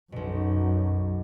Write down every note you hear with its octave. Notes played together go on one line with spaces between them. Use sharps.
B1 F#2 B2